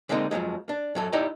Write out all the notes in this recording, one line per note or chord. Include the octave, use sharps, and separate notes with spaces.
D3 G#3 A#3 C4 D#4
F2 F3 F#3 G#3
D4
F#2 F#3 A4
D#4 E4 G4 D5 D#5 A#5